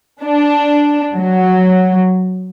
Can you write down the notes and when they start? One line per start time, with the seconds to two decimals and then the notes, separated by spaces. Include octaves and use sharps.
0.22 D4
1.15 F#3